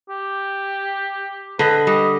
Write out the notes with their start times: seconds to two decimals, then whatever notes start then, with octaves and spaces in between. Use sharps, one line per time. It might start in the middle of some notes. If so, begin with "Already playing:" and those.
0.09 G4
1.59 D3 B4 D#5
1.87 G3 D#5